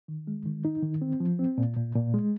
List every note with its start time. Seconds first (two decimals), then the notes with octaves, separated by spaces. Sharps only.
0.08 D#3
0.27 G#3
0.46 D#3
0.65 D#4
0.83 D#3
1.02 C4
1.20 F3
1.39 C4
1.58 A#2
1.77 A#2
1.95 A#2
2.14 G#3